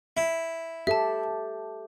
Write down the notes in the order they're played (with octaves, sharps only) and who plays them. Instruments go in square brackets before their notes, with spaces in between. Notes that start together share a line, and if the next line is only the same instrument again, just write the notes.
[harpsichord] E4
[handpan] G4 A4 [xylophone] E5 A5